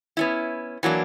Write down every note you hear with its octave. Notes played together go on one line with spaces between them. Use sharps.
B3 C#4 E4
E3 F#3 A#3 D4